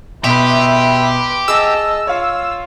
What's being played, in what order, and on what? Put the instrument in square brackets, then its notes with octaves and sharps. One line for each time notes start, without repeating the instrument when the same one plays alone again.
[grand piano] B2 [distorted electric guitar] G4 [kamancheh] B4 C6 [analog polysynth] E5
[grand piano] G#4 [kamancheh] D#5 A5 [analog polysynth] E6
[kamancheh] F4 [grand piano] C#5 F5